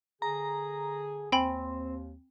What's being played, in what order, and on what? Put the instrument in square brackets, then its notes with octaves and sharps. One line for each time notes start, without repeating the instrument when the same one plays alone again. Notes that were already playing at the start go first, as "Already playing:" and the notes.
[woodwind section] D3 G#4 [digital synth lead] A#5
[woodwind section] D#2 [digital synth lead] C4 [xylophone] G5 G#5 B5